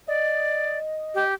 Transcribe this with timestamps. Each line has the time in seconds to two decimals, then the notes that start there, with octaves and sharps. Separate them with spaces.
0.08 D5 D#5
1.15 G4